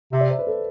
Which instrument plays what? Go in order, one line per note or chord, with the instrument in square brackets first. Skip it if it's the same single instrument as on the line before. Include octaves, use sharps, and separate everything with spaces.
[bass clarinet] C3 [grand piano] E5
[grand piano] D5
C5
B4
A4